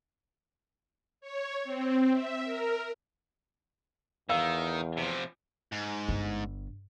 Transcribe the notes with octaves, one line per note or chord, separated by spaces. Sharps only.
C#5
C4
E5
A#4
E2 D#3 F5 E6
C3 F3
G#2
G1